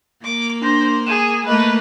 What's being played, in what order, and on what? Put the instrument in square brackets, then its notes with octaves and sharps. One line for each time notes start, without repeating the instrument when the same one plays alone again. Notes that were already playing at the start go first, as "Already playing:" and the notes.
[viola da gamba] A#3 [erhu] D6
[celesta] D4 A#6 [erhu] C5
[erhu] G#4 [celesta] G#6 D#7 E7
[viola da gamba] A3 A#3 [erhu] B4 [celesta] D#5